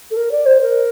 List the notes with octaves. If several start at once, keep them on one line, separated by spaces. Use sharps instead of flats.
A4
A#4
D5
C5
A#4